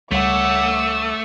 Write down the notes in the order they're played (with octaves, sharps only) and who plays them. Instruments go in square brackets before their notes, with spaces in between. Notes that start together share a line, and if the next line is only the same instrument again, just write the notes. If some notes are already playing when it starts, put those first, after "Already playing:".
[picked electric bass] C#2 G3 [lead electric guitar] A3 [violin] C#5 F#5 [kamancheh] D6 E6